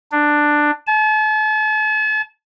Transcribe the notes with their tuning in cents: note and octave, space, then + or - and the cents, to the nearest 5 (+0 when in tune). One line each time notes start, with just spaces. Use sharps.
D4 +10
A5 -40